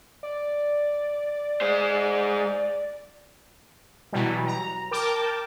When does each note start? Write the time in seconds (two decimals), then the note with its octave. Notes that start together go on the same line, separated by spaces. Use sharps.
0.23 D5
1.61 G#3 C5
4.13 B2 E3 F#3 G3
4.46 A#5
4.91 A#4 G5 A5 D6